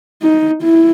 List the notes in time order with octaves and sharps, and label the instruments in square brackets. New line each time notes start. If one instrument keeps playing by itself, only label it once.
[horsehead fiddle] D#4
E4